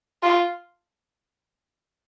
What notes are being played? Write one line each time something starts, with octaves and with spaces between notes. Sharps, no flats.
F4